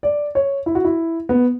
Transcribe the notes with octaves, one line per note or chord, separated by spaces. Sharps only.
D5
C#5
E4
F#4
E4
B3